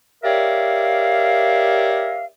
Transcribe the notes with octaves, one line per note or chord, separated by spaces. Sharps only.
G4 A#4 C#5 D5 E5 F5